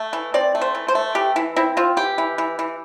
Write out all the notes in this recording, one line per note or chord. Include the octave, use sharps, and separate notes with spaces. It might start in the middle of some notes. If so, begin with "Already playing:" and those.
Already playing: A3
E3
C4 D5
A3
C5
E3
C5
A3
E3 G4
E3 E4
C4 E4
C4 F4
E3 G4
E3
E3
E3